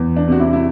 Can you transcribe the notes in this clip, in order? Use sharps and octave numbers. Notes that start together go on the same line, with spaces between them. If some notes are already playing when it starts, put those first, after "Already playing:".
Already playing: E2
D4
C3 F#4
E4
E4